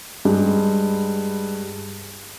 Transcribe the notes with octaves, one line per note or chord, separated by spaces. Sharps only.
G2 G3 G#3